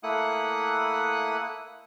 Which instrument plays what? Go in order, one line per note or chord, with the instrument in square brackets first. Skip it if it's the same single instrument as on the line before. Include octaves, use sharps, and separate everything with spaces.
[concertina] A3 A#3 E4 F#5 D#6 F#6